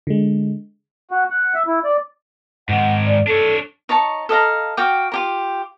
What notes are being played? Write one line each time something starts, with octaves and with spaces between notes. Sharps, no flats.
D3 G#3
F#4
F#5
E5
E4
D5
G#2 D#3 F#5
D5
D4 A4 C#5
D#4 C#5 A5 C#6
A4 D#5 F5 A#5
F#4 F5 G5 D6
F4 G4 A#4